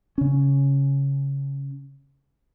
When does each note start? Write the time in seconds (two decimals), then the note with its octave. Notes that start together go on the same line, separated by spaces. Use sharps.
0.18 C#3 C#4